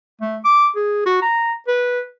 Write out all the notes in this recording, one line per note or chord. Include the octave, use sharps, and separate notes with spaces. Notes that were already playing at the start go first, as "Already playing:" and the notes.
A3
D6
G#4
F#4
A#5
B4